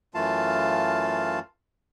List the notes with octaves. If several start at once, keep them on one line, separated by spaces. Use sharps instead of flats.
F#2 E3 A3 F4 F5 A5